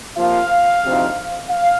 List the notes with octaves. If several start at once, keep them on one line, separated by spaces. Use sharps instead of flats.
C3 F3 A#3 F4 F5
D2 C3 F3 C4 D#4
F5